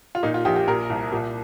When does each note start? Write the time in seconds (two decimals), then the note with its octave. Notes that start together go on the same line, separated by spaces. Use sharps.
0.15 F4
0.23 A#2 D#4
0.34 F4
0.45 A#1 G4
0.56 G4
0.68 A#2 A#4
0.90 C2
1.12 A#2